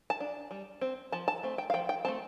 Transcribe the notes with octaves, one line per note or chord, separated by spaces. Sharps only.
A5
D4
G3
C4
F3 A5
A5
A3 C4
G5
F5
F3 G5
G5
A3 C4 A5